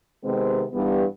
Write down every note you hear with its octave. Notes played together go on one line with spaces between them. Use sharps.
C3 D#3 G#3 B3 C4
G2 E3 G3 B3